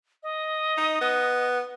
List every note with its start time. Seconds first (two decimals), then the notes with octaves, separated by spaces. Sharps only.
0.23 D#5
0.77 D#4
1.01 B3